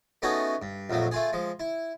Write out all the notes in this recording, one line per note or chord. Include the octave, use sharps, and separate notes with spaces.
A3 B3 C#4 D#4 F#4 G#4
G2
A#1 F2 F#3 A3
A3 F4 G#4
F3 G#3
E4